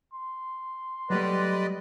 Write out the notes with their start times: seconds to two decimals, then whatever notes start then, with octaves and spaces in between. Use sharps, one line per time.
0.13 C6
1.10 F#3 G3 A3 B4 D5 D#5